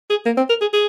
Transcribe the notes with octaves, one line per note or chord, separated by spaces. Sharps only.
G#4
A#3
C4
A#4
G#4
G#4